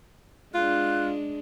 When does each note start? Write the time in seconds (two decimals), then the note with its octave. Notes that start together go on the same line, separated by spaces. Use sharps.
0.54 G#3 D4 F4 F#6